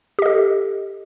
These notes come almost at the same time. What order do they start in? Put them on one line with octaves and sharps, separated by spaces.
G4 D#5 A4